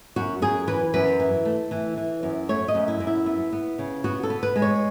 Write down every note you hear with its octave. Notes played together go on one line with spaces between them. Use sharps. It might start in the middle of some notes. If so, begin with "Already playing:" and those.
F#2 F#4
F#2 G#4
E3 B4
F#2 B4
E3
A3
E3
E3
F#2
A3 C#5
D#5
F#2
E4
F#2
E4
B3
B3
C#3
B3 F#4
A4
B3
B4
G#3
C#5